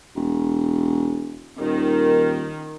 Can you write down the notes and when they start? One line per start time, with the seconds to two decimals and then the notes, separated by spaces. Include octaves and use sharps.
0.16 E1
1.59 D#1 D#3